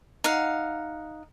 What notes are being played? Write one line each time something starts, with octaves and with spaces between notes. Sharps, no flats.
D#4 F5 F#5